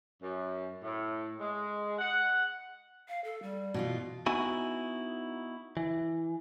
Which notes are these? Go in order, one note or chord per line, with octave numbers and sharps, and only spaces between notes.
F#2
A2
G#3
F#5
F5
A4
G3
B2 E3 F4
B3 D#4 E4 F#4 G#5
E3